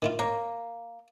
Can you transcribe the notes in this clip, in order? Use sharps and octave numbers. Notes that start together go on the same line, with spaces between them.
D#3 E4 F4
A#3 C#5